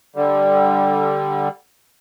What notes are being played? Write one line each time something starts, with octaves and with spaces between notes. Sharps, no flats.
D3 G3